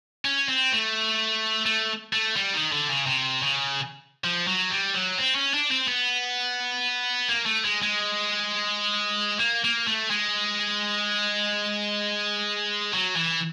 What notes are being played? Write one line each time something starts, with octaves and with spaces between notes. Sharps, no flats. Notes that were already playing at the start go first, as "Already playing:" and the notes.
C#4
C4
A3
A3
A3
G3
D#3
D3
C#3
C3
C#3
F3
F#3
G3
F#3
C4
C#4
D4
C4
B3
A#3
A3
G#3
G#3
A#3
A#3
A3
G#3
F#3
E3